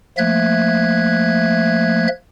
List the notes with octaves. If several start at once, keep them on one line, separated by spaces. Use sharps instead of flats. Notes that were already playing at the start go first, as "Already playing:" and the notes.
F3 A3 A#3 E5 F#6 G#6